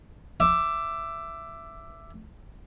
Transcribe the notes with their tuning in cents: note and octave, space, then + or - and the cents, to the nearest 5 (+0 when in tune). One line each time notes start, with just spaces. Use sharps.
E5 +15 D6 +0